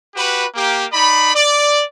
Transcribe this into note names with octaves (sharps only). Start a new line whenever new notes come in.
F#4 G4 B4
A#3 G4
D#4 D5 B5
D5